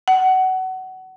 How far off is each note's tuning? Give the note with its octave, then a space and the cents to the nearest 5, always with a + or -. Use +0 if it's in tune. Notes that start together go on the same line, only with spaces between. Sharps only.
F#5 +20